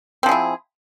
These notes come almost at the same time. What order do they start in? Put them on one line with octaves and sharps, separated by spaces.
C4 F3 G#4 E4